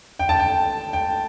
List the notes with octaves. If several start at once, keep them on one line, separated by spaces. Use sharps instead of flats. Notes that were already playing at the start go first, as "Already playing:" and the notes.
G5
A5
G5
G5